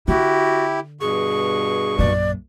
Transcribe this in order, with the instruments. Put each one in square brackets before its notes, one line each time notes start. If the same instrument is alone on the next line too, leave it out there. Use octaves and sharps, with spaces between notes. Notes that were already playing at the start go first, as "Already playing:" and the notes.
[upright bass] D3 [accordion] E4 G4 [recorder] F#4
[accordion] G2 B2 C#6 [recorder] G#4
[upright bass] A#1 F#2 [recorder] D5